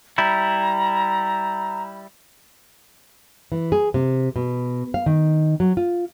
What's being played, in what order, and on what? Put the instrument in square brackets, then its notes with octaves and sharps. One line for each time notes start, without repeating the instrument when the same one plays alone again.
[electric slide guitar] G3 E4 [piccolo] A#5
[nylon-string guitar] E3
G#4
C3
B2
F5
D#3
F#3
F4